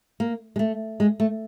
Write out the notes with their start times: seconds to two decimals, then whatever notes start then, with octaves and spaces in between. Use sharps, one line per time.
0.20 A#3
0.56 G#3
0.59 A3
1.00 G#3
1.20 A3